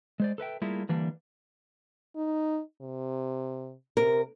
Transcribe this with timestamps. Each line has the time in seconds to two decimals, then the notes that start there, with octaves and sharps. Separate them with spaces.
0.20 G#3 C5 D5
0.38 A4 B4 E5 G5
0.62 G3 A3 A#3 E4 F4 G#4
0.89 D3 E3 G3 A#3 D4
2.16 D#4
2.81 C3
3.97 C3 A#4